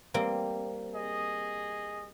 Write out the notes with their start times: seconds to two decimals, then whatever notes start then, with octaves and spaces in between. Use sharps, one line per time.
0.14 G3 A#3 C4
0.95 G#4 D#5